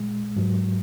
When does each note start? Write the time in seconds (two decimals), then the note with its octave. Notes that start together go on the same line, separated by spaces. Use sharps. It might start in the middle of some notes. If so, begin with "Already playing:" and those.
Already playing: A#2 G#3
0.36 G#2 F#3